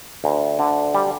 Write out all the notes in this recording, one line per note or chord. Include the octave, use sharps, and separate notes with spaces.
D2
D3
G3